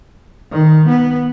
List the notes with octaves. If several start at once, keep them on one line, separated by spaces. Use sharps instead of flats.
D#3
B3